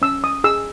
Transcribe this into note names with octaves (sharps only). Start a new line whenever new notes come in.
C#4 E6
D#6
G#4 E6